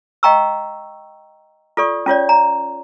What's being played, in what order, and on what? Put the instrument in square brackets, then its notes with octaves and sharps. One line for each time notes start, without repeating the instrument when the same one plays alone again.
[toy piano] D#5 F5 G5 A#5 C#6 E6
F4 A4 D5 C#6
C#4 F4 C#5 D5
A#5